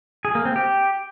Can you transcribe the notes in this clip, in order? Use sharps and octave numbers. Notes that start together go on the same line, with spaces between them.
G#4
A#3
C4
G4